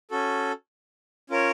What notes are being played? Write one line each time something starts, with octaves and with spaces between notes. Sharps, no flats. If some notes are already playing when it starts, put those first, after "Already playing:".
C#4 F#4 A4
C#4 F4 A#4 C#5